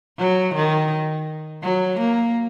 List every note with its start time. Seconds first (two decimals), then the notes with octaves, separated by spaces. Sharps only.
0.19 F#3
0.55 D#3
1.63 F#3
2.00 A#3